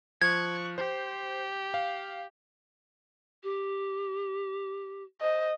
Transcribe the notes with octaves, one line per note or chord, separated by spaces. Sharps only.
F3 C#6 F#6 G#6
G4 C5
F5
G4
C5 D#5